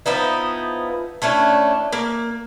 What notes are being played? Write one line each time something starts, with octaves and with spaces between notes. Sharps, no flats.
F3 B3 D#4 E4
A3 C#4 D4 E4
A#3